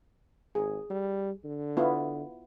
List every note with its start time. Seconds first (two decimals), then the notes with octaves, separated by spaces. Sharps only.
0.55 G#1 G#4
0.90 G3
1.44 D3
1.77 B3 E4 F4